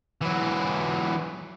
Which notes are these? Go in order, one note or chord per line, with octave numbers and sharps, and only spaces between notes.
E3 F#3